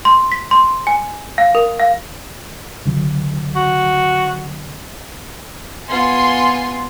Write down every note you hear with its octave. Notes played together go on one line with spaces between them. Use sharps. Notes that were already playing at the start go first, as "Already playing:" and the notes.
C6
B6
C6
G#5
F5
A#4
F5
C#2 D3 F#3
F#4
B3 F4 G#5 C6